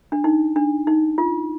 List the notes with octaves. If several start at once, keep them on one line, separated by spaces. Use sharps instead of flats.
D4
D#4
D4
D#4
F4